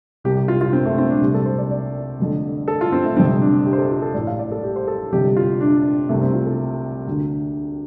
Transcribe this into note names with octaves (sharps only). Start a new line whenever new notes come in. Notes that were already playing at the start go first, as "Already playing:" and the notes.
C2 C3 G4
G4
F4
F4
C4
A3
C4
D4
C2 C3 G4
A4
C5
D5
D5
F1 F2 D3
A4
F4
C4
A3
G1 F2 C3 C4
D4
G4
C5
A4
F4
A4
A1 A2 D5
F5
D5
A4
G4
C5
A4
G1 F2 C3 G4
F4
D4
C2 C3 A3
C4
F4
A4
D2 D3